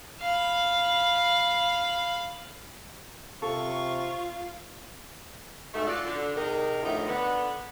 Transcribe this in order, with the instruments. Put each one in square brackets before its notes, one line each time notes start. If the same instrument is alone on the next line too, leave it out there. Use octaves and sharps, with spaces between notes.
[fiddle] F5 B5
[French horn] C3 [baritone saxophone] F4 [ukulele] A4 [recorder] C#6
[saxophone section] G#2 B2 A3
F4 F#4 A4 D5
D3
C3 G#3 D#4 A#4
D2 A2 F3 D#4 E4
D3 B3